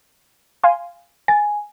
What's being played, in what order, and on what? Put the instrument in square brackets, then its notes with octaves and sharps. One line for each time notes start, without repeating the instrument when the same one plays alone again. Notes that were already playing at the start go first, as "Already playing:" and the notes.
[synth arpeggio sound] F5 G#5 C6
[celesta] G#5 [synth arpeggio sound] A6